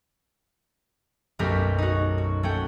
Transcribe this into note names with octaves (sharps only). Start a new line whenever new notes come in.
B1 F#2 A3 G4 A#4 B6
D#4 F#4
F#4
A3 C#4 F#5 G5